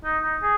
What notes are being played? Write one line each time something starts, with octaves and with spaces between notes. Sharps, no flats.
D#4
D#4
G#4